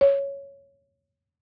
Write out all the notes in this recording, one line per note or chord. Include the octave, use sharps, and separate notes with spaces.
C#5